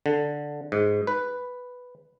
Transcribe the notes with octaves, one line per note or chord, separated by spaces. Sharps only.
D3
G#2
B4